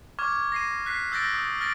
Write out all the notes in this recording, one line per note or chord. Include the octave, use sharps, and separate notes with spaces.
C#6 D6 F6 G#6
A#6 C7 D#7
F#6 B6 C7
E6 G6 A6 A#6 D7
D#6
F6 A6 A#6 D7